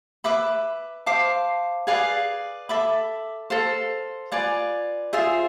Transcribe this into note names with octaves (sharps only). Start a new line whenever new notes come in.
B4 E5 B5 D6
C5 F5 A5 D6
G#4 B4 D5 F5
A4 E5 B5 D6
A4 C5 F5
F4 B4 D5 G#5
F4 G#4 C5 E5